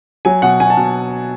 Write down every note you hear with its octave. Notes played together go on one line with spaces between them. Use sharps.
F#3 G#5
B2 F#5
B2 G#5
A5
B2